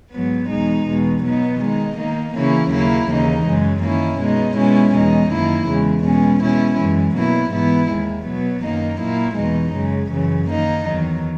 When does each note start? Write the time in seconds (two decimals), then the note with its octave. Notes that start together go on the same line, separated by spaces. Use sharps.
0.13 G#2 F#3 B3
0.50 E2 B2 G#3 D#4
0.87 E2 B2 G#3
1.24 B2 F#3 B3 D#4
1.60 D#3 G#3 D#4
1.98 D#3 A#3 D#4
2.35 C#3 E3 A#3 C#4 E4
2.72 D#2 C#3 F#3 A#3 E4
3.09 D#2 C#3 E3 A#3 D#4
3.45 F#2 C#3 G#3
3.83 D#3 A#3 C#4 E4
4.20 B2 G#3 D#4
4.56 B2 G#3 C#4 E4
4.94 E2 B2 G#3 D#4
5.31 F#2 D#3 A#3 E4
5.68 E2 C#3 G#3
6.04 B2 G#3 C#4
6.41 B2 G#3 C#4 E4
6.79 F#2 E3 G#3
7.16 B2 F#3 A#3 E4
7.52 G#2 E3 B3 E4
7.90 D#2 D#3 G#3
8.27 B2 F#3 B3
8.63 F#2 D#3 A#3 D#4
9.00 A#2 F#3 A#3 E4
9.37 E2 B2 G#3 D#4
9.73 F#2 C#3 G#3
10.10 F#2 C#3 E3
10.48 D#3 A#3 D#4
10.85 E2 D#3 F#3